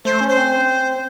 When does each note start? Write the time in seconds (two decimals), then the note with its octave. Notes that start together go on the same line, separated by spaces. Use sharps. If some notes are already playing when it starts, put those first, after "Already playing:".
0.05 A3 C5
0.21 C#4
0.29 C5
0.37 C4